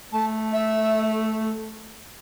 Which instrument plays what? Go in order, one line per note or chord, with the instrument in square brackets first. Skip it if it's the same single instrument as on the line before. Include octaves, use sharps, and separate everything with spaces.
[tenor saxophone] A3 [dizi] A5
[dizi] E5